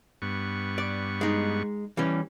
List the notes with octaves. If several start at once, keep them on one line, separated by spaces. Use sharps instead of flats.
G2 B3 C#6
D5
G#3 D#4
E3 G3 C#4